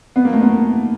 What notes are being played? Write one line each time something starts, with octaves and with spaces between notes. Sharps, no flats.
B3
A#3
A3
B3